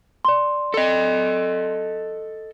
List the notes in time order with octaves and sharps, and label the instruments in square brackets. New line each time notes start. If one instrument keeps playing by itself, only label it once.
[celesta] D5 C6
[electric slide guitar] A4 D#5